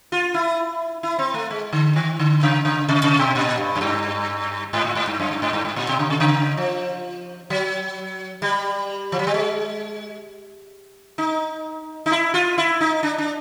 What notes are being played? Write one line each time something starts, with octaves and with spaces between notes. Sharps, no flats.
F4
E4
E4
C4
A3
G#3
D3
D#3
D3
C#3
C#3
C3
C3
B2
A#2
G2
F#2
G2
G#2
A2
G#2
G2
F#2
G2
G#2
G2
G#2
A#2
B2
C#3
C3
C#3
F3
F#3
G3
F3
F#3
G3
G#3
D#4
D#4
E4
F4
E4
D#4
D4
D4